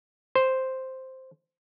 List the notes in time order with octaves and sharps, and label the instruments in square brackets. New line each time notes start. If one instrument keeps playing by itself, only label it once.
[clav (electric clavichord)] C5